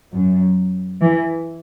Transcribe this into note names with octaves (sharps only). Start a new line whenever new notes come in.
F#2
E3